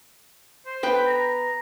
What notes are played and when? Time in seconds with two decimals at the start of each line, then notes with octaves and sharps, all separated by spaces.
0.66 C5
0.83 B3 B4 G5
1.07 A#5